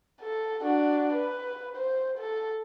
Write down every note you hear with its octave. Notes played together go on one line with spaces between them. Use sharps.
A4
D4 F#4
B4
C5
A4